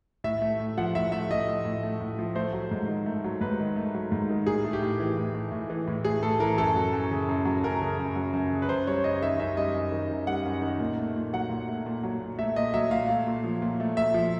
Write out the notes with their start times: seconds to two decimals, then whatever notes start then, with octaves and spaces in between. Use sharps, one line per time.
0.24 A2 E5
0.42 A3
0.60 A2
0.78 F3 F#5
0.95 A2 E5
1.12 A3 E5
1.30 A2 D#5
1.48 F3
1.65 A2
1.83 A3
2.00 A2
2.19 F3
2.35 A3 C5
2.53 F#3
2.71 G#2
2.88 D#3
3.06 A3
3.24 F#3
3.41 G#2 B4
3.59 D#3
3.76 A3
3.94 F#3
4.12 G#2
4.29 D#3
4.47 A2 G#4
4.64 A3
4.73 G4
4.82 A2
5.00 E3
5.17 A2
5.35 A3
5.52 A2
5.70 E3
5.87 A2
6.05 A3 G#4
6.23 A2 A4
6.40 E3 A#4
6.57 F#2 A4
6.76 F#3
6.93 F#2
7.11 C#3
7.29 F#2
7.45 F#3
7.64 F#2 A#4
7.81 C#3
7.99 F#2
8.16 F#3
8.33 F#2
8.52 C#3
8.62 B4
8.69 F#2 C5
8.87 G3 C#5
9.04 F#2 D#5
9.22 D#3 E5
9.40 F#2 E5
9.57 G3 D#5
9.74 F#2
9.92 D#3
10.09 F#2
10.27 G3 F#5
10.45 F#2
10.62 D#3
10.80 A#2
10.97 A3
11.16 A#2
11.33 F#3 F#5
11.50 A#2
11.69 A3
11.86 A#2
12.03 F#3
12.21 A#2
12.39 A3 E5
12.56 A#2 D#5
12.74 F#3 E5
12.91 A#2 F5
13.09 A3
13.27 A#2
13.44 F3
13.62 A#2
13.80 A3
13.96 A#2 E5
14.14 F3